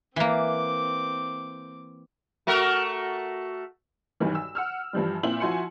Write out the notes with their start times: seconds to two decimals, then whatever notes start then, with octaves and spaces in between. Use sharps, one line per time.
0.16 E3 A#3 C4 D6
2.47 A3 F#4 A#4
4.20 B1 G2 D#3 E3
4.35 E6
4.55 F#5 E6 F6
4.93 G2 E3 F3 G3
5.23 A#2 C4 E4 F#7
5.40 F3 E4 F#4 G#5 C6 C#7